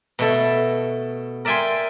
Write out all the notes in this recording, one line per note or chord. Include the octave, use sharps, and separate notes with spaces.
B2 A3 A4
A#4 D5 E5 G5 G#5 C6